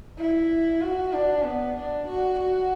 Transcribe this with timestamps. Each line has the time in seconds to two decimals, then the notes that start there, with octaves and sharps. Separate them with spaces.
0.18 E4
0.81 F#4
1.13 D4
1.45 B3
1.76 D4
2.07 F#4
2.39 F#4